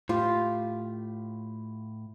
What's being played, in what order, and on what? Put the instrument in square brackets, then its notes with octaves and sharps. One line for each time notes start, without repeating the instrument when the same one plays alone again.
[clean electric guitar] A2 [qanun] F4 G4